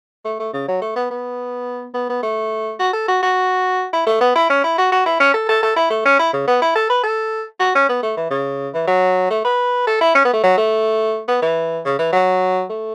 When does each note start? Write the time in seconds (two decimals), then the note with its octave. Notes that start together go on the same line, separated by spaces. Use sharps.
0.25 A3
0.39 A3
0.53 C#3
0.68 F#3
0.82 A3
0.96 B3
1.10 B3
1.94 B3
2.09 B3
2.23 A3
2.79 F#4
2.93 A4
3.08 F#4
3.22 F#4
3.93 E4
4.06 A3
4.21 B3
4.35 E4
4.50 C#4
4.64 E4
4.78 F#4
4.92 F#4
5.06 E4
5.20 C#4
5.34 A4
5.49 A4
5.63 A4
5.76 E4
5.90 A3
6.05 C#4
6.19 E4
6.33 C#3
6.47 B3
6.62 E4
6.75 A4
6.90 B4
7.03 A4
7.60 F#4
7.75 C#4
7.89 B3
8.03 A3
8.17 E3
8.30 C#3
8.74 E3
8.87 F#3
9.30 A3
9.44 B4
9.87 A4
10.01 E4
10.15 C#4
10.25 B3
10.33 A3
10.43 F#3
10.57 A3
11.28 B3
11.42 E3
11.85 C#3
11.99 E3
12.13 F#3
12.70 A3